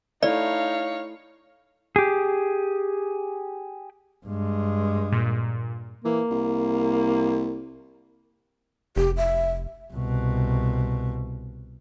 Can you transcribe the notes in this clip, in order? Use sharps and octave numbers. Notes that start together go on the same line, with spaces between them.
A3 D#4 E4 C#5 D5 F5
G4 G#4
G2 G#3
A#2
E3 A#3
C2
F1 G4
E5
C2 B2